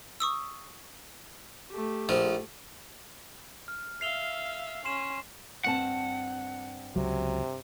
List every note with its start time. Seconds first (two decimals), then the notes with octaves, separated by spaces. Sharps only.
0.20 C#6 D#6 E6
1.71 A3 G4
2.09 A#1 F3
3.68 F6
4.01 E5 F5 C7 F7 G7
4.85 C#4 C6 C7 E7
5.64 G2 C4 F#5 A5
6.96 C#2 C3 F#3